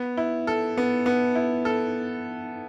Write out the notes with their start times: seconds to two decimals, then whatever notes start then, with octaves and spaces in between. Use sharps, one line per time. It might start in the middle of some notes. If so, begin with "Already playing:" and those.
Already playing: B3
0.17 E4
0.47 A4
0.77 B3
1.06 B3
1.35 E4
1.65 A4